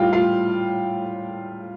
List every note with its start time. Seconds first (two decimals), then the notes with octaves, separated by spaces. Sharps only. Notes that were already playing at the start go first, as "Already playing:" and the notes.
Already playing: A2 G3 F4 F5 G5
0.13 F4 F5